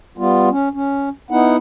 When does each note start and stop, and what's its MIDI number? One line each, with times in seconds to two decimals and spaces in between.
0.18 0.49 55
0.18 0.49 59
0.18 0.49 65
0.50 0.69 61
0.74 1.09 61
1.31 1.56 59
1.31 1.56 63
1.31 1.56 64
1.31 1.56 78